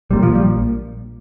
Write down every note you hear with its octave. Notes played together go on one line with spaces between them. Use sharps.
A#1 A#2 G3
F3
G3